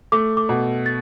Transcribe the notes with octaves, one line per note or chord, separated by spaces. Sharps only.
A3 D6
D6
B2
A6